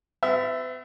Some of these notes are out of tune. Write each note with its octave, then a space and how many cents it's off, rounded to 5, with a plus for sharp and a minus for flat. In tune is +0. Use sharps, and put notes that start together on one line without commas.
B3 +45 E5 +0